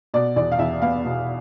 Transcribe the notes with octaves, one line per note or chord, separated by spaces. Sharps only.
B2 D5
E2 D5
F5
E2 E5
B3 F5
B2